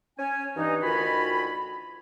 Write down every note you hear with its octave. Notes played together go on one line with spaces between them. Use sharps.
C#4 G#5
G2 E3 D#4
D2 D#3 F4 F#4 G#5 B5